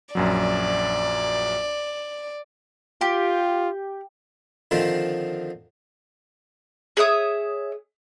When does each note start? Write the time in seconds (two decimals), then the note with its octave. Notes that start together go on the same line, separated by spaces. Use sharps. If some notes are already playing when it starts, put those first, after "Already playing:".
0.15 A#1 F#2 F#3 D5
3.01 F4 G4
4.71 D3 D#3 F3 C4
6.97 G#4 C#5 E5 D#6